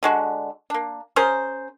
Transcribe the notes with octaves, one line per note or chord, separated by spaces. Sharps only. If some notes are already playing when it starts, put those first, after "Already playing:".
D3 G#3 F#4
A#3 D4
C#4 G#4 A#4 C5